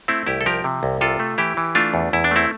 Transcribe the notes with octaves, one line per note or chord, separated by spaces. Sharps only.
A3 C4 E4
C2 E4 G4
A4
F3 G4 A#4
C3
C2
C3 F4 A4
A3
E3 E4 G4
E3
A3 D4 F4
E2
E2 E4
D4
A3 C4 E4